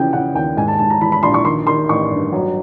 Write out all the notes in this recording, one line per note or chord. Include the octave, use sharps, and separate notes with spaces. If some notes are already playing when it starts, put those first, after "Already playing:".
Already playing: C#3 E3 F3 G5
C#3 F#5
D#2 G5
G#2 G#5
A5
G#2 A5
A#5
E3 B5
B5
A#1 C6
C#6
D#3 C6
D#3 C6
A1 C#6
G2
F#3